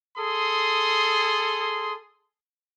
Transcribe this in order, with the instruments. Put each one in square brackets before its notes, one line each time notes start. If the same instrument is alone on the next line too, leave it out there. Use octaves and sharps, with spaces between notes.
[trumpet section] G#4 A4 C6 D#6